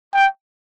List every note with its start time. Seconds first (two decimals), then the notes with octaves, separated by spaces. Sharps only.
0.14 G5